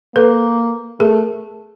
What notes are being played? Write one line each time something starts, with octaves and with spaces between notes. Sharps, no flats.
A#3 A4 B4
A3 G#4 A#4